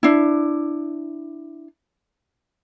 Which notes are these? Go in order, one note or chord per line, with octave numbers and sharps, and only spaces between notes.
D4 E4